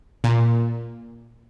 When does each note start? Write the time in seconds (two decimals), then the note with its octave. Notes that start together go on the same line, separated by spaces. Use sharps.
0.24 A#2